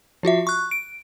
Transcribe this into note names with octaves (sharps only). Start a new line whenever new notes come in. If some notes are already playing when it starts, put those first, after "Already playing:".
F3 F4 F#4 E5
C#6 F#6
D7